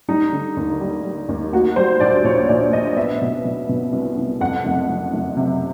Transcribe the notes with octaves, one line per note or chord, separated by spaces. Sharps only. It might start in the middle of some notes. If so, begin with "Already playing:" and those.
G3 D#4
D3
D#2
G3
G3
D#2
A#3 F#4
G3 C5
A#1 D5
A#2 C#5
A#1 D5
A#1 D#5
B3 E5
B2
B2
B2
C2
C2
F2 F#5
F#1
F#1
F#1
C3